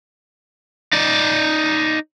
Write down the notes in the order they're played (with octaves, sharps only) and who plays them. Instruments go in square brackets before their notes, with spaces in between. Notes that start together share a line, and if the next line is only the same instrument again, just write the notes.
[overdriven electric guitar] D#4 D5